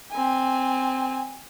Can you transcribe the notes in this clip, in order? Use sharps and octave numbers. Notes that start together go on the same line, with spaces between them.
C4 G#5